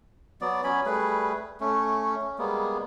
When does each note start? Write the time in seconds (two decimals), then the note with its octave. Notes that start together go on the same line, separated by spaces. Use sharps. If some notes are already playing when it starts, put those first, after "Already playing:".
0.41 F#3 B3 D5
0.64 F#3 C#4 G#5 B5
0.86 G3 A3 G#4 B4
1.60 A3 C#4
2.22 C#4
2.38 G3 G#3 A#3 B3